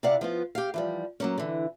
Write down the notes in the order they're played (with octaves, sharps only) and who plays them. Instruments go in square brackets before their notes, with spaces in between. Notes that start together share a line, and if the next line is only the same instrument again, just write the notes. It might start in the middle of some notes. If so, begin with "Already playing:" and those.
[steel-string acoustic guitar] C3 E4 D5 F5 F#5
F3 B3 F4
G4 F5
E3 F3 G3
F#3 A#3 C#4
D3 E3